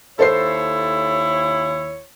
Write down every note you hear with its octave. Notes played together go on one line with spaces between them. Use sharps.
D#2 E4 A4 C5 C#5 C7